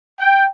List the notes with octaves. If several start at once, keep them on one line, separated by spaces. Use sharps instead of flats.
G5